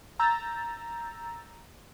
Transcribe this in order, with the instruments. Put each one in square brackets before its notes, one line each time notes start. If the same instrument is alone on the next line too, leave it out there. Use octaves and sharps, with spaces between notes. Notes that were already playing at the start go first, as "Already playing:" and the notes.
[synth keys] A#5 E6 G6 A6